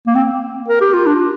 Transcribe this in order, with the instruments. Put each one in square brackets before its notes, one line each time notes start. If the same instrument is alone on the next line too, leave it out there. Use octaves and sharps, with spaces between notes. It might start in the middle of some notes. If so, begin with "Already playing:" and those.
[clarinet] A#3
C4
A#4
G4
F4
D4